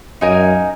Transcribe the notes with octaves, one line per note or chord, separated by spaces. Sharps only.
F#2 D#4 A#4 F5 G#5